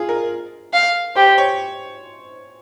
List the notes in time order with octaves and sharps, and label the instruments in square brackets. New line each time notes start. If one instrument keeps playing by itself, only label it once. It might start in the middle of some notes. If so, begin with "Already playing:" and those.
Already playing: [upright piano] F4 G#4
A#4
[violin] F5
[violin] G4 [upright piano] C5
[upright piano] C5
C#5